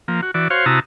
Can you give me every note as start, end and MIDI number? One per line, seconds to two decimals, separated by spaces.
0.08 0.21 53
0.08 0.21 58
0.22 0.31 66
0.34 0.48 52
0.34 0.48 66
0.34 0.48 74
0.50 0.66 66
0.50 0.66 72
0.50 0.66 73
0.50 0.66 77
0.66 0.80 48
0.66 0.80 64
0.66 0.80 66
0.66 0.80 81
0.66 0.80 82
0.66 0.80 87